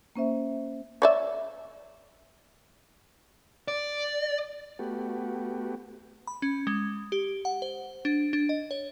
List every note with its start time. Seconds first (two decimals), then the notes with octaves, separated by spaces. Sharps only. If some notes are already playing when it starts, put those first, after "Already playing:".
0.16 A#3 C#4 C5 E5
1.02 C#5 D5 E5
3.68 D5
4.79 A3 B3 F#4 G4
6.27 B5
6.42 C#4
6.67 G#3
7.12 G4
7.45 F#5
7.62 C5
8.05 D4
8.33 D4
8.49 D#5
8.71 C#5